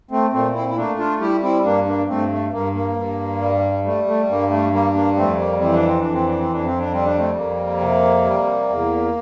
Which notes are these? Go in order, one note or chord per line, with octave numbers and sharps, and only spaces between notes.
A3 C4
A#2 A3 C4
C4 E4
E4
A3 A#3 D4
D4 F4
G3 E4 G4
C4 E4
G2 A#3 D4
A#3 D4
G2 A3 C4
A3
G2 A#3
A#3
G2
G3
G3 A3
A3
G2 A#3
A3
G3 A#3
A#3 D4
F2 A3 C4
A#3
E3 C4
D4
C4
F2 D4
C4
D4
C4
F2 D4
C4
D4
G3 C4
D4
A3 C4
F2 A#3
C3
G3
E2